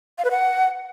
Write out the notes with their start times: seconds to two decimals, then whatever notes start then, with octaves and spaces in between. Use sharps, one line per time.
0.18 F5
0.25 B4
0.31 F#5